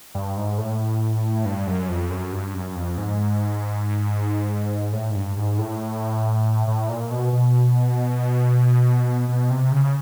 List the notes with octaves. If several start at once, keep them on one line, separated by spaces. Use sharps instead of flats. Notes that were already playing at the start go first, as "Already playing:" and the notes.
G2
G#2
A2
G2
F#2
F2
F#2
G2
F#2
F2
G#2
A2
G#2
G2
G#2
A2
A2
A#2
B2
B2
B2
C3
C#3